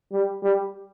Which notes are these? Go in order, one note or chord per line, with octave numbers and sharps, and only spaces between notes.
G3
G3